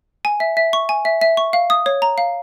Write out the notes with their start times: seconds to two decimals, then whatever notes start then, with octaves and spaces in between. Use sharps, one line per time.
0.25 G#5
0.40 E5
0.57 E5
0.73 C#6
0.89 G#5
1.05 E5
1.21 E5
1.37 C#6
1.53 F5
1.70 D#6
1.86 C#5
2.02 A#5
2.18 F5